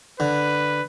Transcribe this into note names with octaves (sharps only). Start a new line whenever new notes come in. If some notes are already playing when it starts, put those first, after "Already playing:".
D3 B4